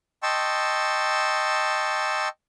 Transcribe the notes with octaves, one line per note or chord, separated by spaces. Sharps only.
D#5 G5 A5 C6 C#6 E6